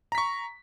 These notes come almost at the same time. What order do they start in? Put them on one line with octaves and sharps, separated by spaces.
A#5 B6 C#6